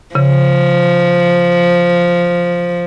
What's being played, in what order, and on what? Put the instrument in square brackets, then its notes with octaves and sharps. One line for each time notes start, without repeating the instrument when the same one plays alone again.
[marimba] C#3 [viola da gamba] F3